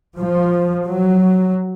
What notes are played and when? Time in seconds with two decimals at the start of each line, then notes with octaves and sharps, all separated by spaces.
0.17 F3
0.85 F#3